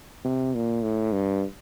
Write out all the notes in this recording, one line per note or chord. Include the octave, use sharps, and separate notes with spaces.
C3
A#2
A2
G2